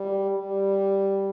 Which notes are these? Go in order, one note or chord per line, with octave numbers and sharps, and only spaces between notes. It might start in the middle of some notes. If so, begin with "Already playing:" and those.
Already playing: G3
G3